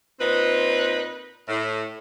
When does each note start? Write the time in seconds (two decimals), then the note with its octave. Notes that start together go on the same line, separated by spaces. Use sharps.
0.19 A#2 C4 D#4 B4
1.48 A2